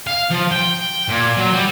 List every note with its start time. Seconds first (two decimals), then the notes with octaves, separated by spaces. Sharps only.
0.07 F5
0.30 F3
0.51 G5
1.08 A#2
1.37 F#3
1.53 G3